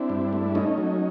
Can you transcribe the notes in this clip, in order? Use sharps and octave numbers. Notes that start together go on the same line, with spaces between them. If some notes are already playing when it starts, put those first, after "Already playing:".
Already playing: C4 D4 E4
G2
A3
A3 C#4 D#4
F#3